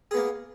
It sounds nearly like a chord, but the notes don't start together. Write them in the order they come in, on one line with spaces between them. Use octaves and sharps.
G#4 B3 A#3